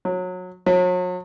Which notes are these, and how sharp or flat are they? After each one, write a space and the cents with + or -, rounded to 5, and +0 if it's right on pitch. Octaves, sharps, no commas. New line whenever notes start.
F#3 -25
F#3 -40